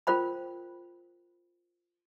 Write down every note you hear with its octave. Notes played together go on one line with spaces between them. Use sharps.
F4 A#4 C5 G5 B5